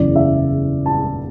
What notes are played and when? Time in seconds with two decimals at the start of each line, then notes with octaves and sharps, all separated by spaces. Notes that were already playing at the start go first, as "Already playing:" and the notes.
Already playing: F#1 E2 C#3 E3 D5
0.16 E5
0.86 A5